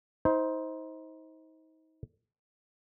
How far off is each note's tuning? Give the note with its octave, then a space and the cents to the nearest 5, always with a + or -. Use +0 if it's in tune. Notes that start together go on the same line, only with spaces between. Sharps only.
D#4 +35 C5 +0